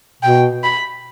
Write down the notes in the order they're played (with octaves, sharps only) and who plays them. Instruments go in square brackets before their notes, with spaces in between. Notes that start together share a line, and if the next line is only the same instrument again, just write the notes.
[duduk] B2 [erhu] G5
[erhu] B5